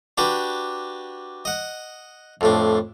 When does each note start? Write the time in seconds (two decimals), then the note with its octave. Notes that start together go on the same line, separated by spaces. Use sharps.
0.18 D4 F#4 G4 B4
1.45 D#5 F#5
2.41 F2 A2 D4